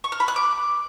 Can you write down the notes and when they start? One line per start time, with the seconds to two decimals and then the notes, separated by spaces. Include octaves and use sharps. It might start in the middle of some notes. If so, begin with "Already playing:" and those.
0.04 C#6
0.12 F6
0.20 B5
0.28 F#6
0.36 D6